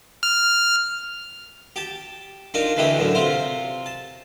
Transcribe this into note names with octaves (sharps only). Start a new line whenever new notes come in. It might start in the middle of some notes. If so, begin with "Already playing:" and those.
F6
G4 A5
D4 D#4 F4 A#4
D2 E3 A3 E4 G4 D#5
F#2 A2 D3
C3 F4 C5
A5